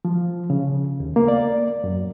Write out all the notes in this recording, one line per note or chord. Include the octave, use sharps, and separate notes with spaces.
F3
C#3
D#2
A#3
D5
F#2